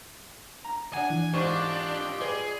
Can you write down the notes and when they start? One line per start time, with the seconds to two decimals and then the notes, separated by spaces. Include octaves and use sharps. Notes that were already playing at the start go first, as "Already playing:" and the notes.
0.65 A#5
0.93 D4 F#5 G#5
1.10 E3
1.34 G#2 D4 F4 G4 C5 D#5 C#6
2.21 G#4 B4 D5